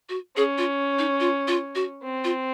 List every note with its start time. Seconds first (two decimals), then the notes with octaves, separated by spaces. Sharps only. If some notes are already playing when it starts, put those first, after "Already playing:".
0.09 F#4
0.36 C#4 G#4
0.58 F4
0.98 D#4
1.20 F4
1.48 F4
1.75 F#4
2.03 C4
2.24 F4